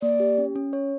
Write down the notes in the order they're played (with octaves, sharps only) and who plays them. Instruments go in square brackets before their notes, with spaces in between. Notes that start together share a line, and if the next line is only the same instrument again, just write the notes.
[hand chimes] A#3 [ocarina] D5
[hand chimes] G4
C#4
C#4
C#5